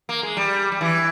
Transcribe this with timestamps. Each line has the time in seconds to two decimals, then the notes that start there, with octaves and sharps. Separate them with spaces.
0.09 A#3
0.23 G#3
0.37 G3
0.72 G3
0.81 E3